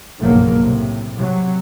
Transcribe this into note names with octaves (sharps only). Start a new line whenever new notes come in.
F#1 B1 G2 F3 F#3 A#3
A2 C3
C3 F#3